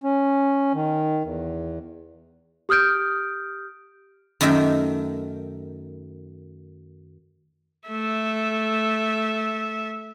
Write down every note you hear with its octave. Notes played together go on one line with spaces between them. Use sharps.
C#4
D#3
E2
G4 D#6 F6 G6 D7
F#2 D#3 A3 E5 G5
A3 E5